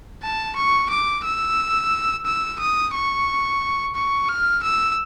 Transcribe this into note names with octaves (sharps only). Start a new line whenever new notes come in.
A5
C#6
D6
E6
E6
D#6
C#6
C#6
F6
E6